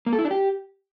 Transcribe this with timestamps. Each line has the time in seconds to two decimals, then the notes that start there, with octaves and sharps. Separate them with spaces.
0.06 A#3
0.13 A4
0.19 E4
0.25 D4
0.31 G4